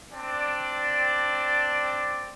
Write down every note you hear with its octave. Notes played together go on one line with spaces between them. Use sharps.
C4 D4 D5